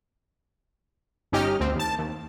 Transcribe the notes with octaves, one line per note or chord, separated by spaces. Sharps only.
G1 C#4 D#4 G4 D#5 F6
D2 C4
D#2 A5
D#2